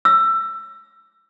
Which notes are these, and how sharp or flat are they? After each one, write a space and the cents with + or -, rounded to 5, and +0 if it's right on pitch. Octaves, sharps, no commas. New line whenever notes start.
E6 +20